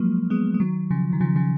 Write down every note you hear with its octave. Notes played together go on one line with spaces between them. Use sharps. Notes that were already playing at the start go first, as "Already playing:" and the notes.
Already playing: F3 F#3 G#3 A#3
G#3 B3
G#3
D#3 F#3
C#3 F3
D#3
C#3 F3
C#3 F3